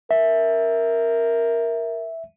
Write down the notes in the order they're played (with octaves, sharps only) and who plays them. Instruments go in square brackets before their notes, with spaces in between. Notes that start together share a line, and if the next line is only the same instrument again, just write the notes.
[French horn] A#4 [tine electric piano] E5